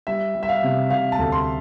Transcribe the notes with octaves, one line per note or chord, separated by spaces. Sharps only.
G3 E5
G3
E5
F5
C3
C3 F5
A5
D2
C6